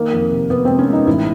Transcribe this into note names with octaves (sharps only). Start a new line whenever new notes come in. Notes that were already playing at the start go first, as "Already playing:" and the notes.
Already playing: D#3 A#3
F2
C3
C3 B3
G#3 C4
C#4
G#3 D#4
A1 E4